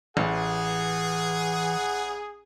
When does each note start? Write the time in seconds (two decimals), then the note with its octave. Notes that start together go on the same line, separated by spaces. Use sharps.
0.17 A1 E3 G#4 F#5